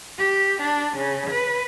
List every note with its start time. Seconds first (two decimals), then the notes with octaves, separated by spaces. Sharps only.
0.18 G4
0.62 D4
0.97 C#3
1.30 B4